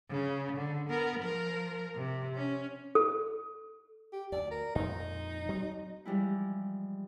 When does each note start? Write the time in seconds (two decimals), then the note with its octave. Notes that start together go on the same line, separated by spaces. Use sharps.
0.10 C#3
0.57 D3
0.89 B3 A#4
1.20 F3 A#4
1.96 C3
2.35 C#4
2.95 A4
4.13 G4
4.32 D2 D5
4.51 A#4
4.75 F2 A#2 G#3 D#4
5.48 D2 F#3 C4
6.05 E3 F3 G3 G#3 E4